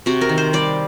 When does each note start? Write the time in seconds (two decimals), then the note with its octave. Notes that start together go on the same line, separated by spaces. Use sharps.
0.06 C3 F#4
0.21 A#4
0.29 D#3
0.38 C5
0.53 G3 D5